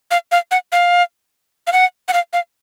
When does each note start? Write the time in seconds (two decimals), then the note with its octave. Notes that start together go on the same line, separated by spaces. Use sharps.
0.11 F5
0.32 F5
0.51 F#5
0.72 F5
1.67 F5
1.73 F#5
2.08 F#5
2.13 F5
2.33 F5